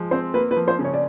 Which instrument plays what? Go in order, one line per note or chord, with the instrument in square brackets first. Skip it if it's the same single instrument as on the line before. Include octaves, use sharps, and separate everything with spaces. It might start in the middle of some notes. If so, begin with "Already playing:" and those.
Already playing: [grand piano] F3 G#3
[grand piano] C4 [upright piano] C5
[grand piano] A#3 [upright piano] B4
[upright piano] B4
[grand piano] F3
[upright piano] C5
[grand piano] C#3
[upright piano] C#5
D5